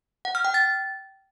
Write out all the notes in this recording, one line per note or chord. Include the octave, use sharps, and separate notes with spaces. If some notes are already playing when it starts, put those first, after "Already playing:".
F#5
F6
G5
A6